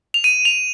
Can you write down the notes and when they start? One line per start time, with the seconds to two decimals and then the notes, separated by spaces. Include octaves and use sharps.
0.14 F7
0.24 D#7
0.45 F7